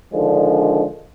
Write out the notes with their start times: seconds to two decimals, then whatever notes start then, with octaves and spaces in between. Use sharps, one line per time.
0.12 D3 D#3 F3 G#3 D4